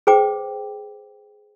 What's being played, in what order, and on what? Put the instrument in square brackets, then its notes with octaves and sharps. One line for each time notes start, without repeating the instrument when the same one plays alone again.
[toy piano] G#4 B4 C5 G5 D6